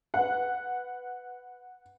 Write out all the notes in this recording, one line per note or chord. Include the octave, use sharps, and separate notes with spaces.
B4 F#5